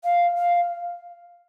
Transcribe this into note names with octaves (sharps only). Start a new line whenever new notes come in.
F5
F5